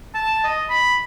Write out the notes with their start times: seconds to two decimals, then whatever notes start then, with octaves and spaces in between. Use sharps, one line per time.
0.14 A5
0.44 D#5
0.70 B5